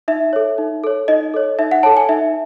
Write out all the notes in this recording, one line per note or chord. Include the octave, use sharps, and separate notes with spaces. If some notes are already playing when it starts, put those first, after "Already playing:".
D#4 E5
A4 C#5
D#4
A4 C#5
D#4 D#5
A4 C#5
D#4 E5
F#5
A4 C#5 A5
G#5
D#4 E5